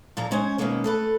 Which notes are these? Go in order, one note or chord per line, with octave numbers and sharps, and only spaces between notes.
A#2 F3 A#3 F4 A#5
G#3 C#4 C5 G#5
B2 D3 D#3 G#3 A#3 C#4
A3 A4 B4